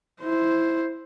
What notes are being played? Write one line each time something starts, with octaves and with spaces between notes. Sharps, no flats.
E4 C5